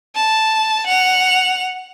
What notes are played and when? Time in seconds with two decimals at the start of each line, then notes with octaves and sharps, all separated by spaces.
0.15 A5
0.87 F#5 F7